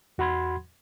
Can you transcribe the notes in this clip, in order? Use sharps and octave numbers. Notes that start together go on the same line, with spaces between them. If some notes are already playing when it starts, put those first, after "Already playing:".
E2 F#4 F#5 B5 C6 G#6